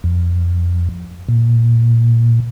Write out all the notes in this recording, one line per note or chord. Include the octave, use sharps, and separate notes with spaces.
F2
A#2